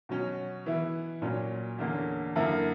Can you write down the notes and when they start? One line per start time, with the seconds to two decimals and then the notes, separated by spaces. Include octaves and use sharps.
0.09 B2 F#3 C#4
0.66 E3 B3 E4
1.22 A#2 F#3 C#4
1.79 E2 D3 A#3 C#4
2.36 F#2 D3 A#3 E4 A#4